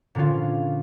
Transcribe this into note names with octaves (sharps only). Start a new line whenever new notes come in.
A#2 D3 C4 C#4 F4